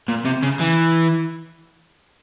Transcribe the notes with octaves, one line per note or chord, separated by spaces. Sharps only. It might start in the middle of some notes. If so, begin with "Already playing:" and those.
A#2
C3
C#3
E3